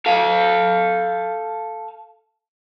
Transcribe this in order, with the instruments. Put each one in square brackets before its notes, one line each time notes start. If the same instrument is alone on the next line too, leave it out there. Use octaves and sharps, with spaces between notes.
[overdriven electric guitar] A4 F5